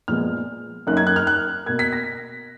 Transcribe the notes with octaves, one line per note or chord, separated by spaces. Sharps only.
A#2 F3 G#3 B3 F6
F#2 D#3 A#3 F#6
G#6
F#6
F6
F#6
B2 A#3 G#6
B6
A#6